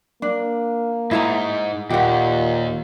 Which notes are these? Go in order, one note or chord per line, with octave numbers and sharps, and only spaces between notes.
A#3 D4
G#2 E4 G#4 A#5
D#2 A#2 G4 F#5